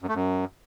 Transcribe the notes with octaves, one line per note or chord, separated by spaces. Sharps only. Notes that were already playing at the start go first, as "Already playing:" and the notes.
F#2
A3
F#2